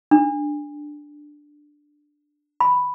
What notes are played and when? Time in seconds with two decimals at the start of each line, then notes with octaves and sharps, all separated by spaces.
0.11 D4
2.60 B5